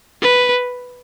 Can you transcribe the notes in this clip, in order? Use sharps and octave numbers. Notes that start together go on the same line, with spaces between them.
B4